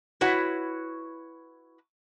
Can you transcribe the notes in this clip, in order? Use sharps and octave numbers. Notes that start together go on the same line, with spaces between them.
E4 F#4 B4 C#5 F#5